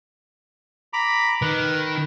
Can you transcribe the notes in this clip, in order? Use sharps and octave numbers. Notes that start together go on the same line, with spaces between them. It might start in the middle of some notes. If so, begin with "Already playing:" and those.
A#5 B5 D6
D#3 B4